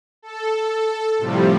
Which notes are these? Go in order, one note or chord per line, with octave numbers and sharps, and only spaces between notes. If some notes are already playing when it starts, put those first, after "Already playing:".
A4
A2 C3 F3 G3